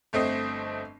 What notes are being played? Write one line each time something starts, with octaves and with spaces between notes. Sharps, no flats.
G1 A3 C4 D#5 C7